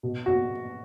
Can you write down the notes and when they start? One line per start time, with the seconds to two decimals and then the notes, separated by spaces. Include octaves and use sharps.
0.03 B2
0.26 F#4